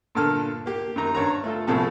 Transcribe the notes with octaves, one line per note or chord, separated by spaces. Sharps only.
G2 A#2 D3 A4 F6
A#3 G4
F#2 D#3 A#5
G2 C#5 A#5
A3 F4 A4
C2 A2 C3 F3 G#4 A4